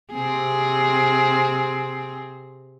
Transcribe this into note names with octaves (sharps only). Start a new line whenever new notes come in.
C3 C4 G#4